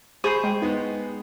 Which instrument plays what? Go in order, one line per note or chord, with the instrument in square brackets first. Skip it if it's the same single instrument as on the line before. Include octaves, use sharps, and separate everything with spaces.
[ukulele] G#4 [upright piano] C5 B5 [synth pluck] C#6 G6 C7
[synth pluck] G#3 G5
[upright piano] G#3 B3 [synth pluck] D#4